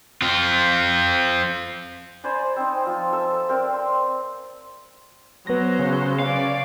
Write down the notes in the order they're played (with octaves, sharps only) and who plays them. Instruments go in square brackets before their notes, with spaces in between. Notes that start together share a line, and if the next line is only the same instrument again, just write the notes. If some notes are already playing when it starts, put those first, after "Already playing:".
[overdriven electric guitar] C4 F4
[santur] C5 D5 G#5 B5
C4 D#4
F3
A4 E5
C4 A#4 D5
C6
[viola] F#3 C5 [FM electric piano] B3 A#6
[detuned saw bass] C#3
[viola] C#4 D5 [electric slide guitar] F5